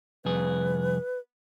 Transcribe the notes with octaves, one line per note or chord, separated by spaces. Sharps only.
C2 F2 G#4 B4